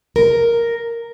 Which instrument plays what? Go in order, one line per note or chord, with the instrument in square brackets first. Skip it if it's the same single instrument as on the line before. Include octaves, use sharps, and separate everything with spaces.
[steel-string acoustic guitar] A#4